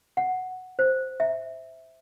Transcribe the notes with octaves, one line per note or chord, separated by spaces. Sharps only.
F#5
C5
E5